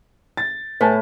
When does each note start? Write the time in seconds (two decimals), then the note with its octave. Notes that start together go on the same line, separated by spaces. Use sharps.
0.37 A6
0.81 A2 B4 G#5 A5